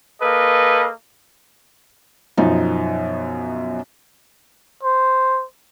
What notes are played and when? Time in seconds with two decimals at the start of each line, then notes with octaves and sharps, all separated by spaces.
0.21 A#3 A4 B4 D#5
2.37 F#2 B2 F3 D#4
4.83 C5